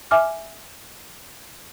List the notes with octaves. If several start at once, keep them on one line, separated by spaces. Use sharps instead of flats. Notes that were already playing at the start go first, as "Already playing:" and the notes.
E5 G#5 D6 F6